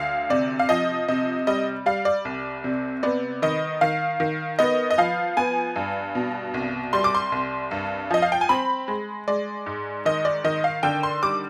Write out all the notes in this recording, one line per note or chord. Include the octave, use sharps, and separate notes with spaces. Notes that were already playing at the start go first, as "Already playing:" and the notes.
Already playing: D2 F5
C3 D5
F5
F3 D#5
C3 D#5
G3 D#5
G3 F5
D5
C2
C3
B3 D5
D#3 D#5
D#3 F5
D#3
B3 D#5
D#5
F3 F5
B3 G#5
G2
B2
C2
G3 C6
D6
C6
C2
G2
F3 D#5
F5
G5
G#5
C4 B5
G#3
G#3 D5
G#2
D#3 D#5
D5
D#3 D#5
F5
D3 G5
C6
G3 D6